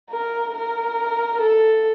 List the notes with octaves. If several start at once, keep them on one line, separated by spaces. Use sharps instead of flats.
A#4
A#4
A4